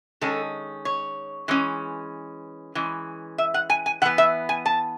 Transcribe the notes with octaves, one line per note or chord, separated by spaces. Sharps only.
D#3 G#3 C#4 A4
C#5
E3 G#3 C#4
E3 G#3 C#4
E5
F#5
G#5
G#5
E3 B3 F#5
E5
G#5
A5